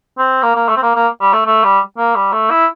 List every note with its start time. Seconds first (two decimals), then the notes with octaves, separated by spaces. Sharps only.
0.18 C4
0.43 A#3
0.56 A#3
0.68 A3
0.76 C4
0.83 A#3
0.96 A#3
1.21 G3
1.33 A3
1.46 A3
1.64 G3
1.98 A#3
2.16 G3
2.33 A3
2.50 E4